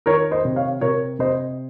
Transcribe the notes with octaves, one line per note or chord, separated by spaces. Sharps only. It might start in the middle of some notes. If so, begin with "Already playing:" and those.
D#3 A#4 C#5
C5 D#5
C3
C#5 F5
C3 A#4 C#5
C3 C5 D#5